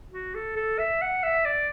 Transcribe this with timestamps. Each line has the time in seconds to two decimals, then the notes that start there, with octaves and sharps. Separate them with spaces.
0.12 F#4
0.35 A4
0.56 A4
0.79 E5
1.02 F#5
1.23 E5
1.45 D5